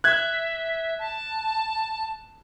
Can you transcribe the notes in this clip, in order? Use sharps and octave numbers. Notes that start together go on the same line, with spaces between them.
E5 F#6 G#6
A5